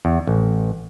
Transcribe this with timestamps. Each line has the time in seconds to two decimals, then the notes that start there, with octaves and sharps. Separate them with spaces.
0.05 E2
0.27 A1